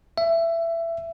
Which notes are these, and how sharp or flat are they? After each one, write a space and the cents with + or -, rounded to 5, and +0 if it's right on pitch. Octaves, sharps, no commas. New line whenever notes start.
E5 +20